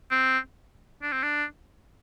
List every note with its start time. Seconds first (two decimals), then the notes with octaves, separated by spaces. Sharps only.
0.11 C4
1.02 D4
1.12 C4
1.23 D4